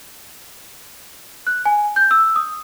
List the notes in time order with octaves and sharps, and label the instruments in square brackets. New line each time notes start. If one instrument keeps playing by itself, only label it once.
[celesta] F#6
G#5
G6
E6
D#6